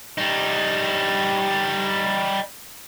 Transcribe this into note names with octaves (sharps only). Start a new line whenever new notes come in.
G3 D#4